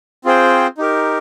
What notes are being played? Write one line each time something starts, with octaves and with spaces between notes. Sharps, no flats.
C4 F4 G#4 C5 G5
D#4 G4 A#4